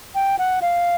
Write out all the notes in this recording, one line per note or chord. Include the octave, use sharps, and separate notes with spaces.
G5
F#5
F5